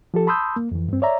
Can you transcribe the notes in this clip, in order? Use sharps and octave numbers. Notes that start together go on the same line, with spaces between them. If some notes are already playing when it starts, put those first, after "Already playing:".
F3 G4 A4
A5 B5 C6 D#6 E6 G6
A#3
F2 E3
G2 C4
C#5 D5 E5 A#5